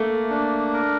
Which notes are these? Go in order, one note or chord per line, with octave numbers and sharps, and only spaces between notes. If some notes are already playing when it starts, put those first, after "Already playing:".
Already playing: A3 A#3
D4
A#4